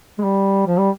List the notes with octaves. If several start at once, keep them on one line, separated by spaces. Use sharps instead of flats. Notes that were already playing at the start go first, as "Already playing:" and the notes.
G#3
G3
F3
G3